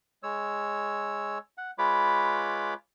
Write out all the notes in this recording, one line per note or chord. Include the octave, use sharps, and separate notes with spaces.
G#3 C#5 E6
F#5
G#3 F4 B4 C#5 B5 D6